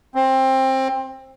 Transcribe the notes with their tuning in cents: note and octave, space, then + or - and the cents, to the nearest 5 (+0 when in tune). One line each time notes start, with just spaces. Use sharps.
C4 +20